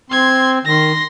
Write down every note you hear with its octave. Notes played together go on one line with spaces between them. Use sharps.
C4 C6 G#6
D#3 C6 A#6